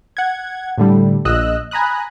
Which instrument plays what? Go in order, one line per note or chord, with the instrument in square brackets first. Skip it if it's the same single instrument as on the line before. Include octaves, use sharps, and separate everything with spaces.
[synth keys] F#5 G#6
A2 D3 G3
A#1 D#5 E6 F#6
G#5 A#5 B5 D#6 F#6